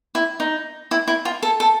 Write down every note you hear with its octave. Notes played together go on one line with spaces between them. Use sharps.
E4
D#4
E4
E4
F4
A4
A4